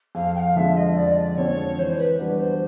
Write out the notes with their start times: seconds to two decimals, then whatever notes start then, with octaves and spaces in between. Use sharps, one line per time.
0.15 F2 F5
0.35 G5
0.40 F5
0.56 D3 F3 G#3 C4 E5
0.76 D#5
0.96 F2 D5
1.37 D3 F3 G#3 C4 C#5
1.78 E3 C5
1.98 B4
2.18 G3 B3 D4 F#4 B4
2.39 C5